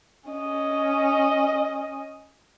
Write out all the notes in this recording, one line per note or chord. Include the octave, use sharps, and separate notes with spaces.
C#4 D#5